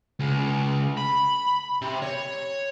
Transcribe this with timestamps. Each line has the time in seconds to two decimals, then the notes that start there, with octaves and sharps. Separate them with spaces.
0.19 C#2
0.97 B5
1.82 C3
2.02 C#5